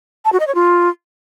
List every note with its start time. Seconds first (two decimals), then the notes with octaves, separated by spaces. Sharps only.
0.25 A5
0.32 F#4
0.40 D#5
0.47 C#5
0.55 F4